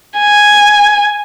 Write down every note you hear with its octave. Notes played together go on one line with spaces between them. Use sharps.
G#5